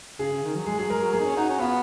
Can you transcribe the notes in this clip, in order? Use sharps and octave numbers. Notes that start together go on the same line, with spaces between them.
C#3 G#4
C#3
D#3
F#3
G#3 G#4
F#3 G#4
G#3 A#4
F#3
A#3 G#4
D#4
C#4
D#4 F#4
C#4
B3 F4